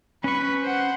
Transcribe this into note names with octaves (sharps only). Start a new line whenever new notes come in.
C#4 B4 C#6
C5 F#5